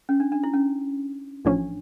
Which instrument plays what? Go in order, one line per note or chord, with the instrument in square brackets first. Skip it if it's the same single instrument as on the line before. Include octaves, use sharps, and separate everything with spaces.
[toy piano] C#4
D4
D4
E4
C#4
[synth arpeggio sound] A1 A2 F3 C#4 [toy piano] D4